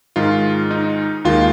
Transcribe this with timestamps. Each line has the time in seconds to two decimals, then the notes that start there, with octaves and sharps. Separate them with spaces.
0.16 G#2 D#3 G#3 F4
0.71 D#4
1.25 D#2 D#3 G#3 F4